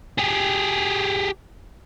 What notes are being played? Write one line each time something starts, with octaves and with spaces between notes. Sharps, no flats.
G4 G#4